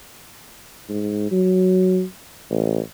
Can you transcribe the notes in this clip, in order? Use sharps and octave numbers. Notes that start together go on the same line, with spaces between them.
G#2
F#3
A1